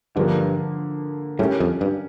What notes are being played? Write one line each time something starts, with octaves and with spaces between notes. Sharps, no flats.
G2 D3 F3 A#3
A2 G3 C#4 G4 A#4
F2
G2